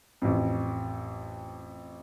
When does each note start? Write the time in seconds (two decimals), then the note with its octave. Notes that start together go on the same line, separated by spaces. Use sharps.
0.22 A1 F2